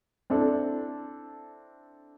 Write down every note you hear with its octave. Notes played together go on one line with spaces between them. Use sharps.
C4 D4 E4 A4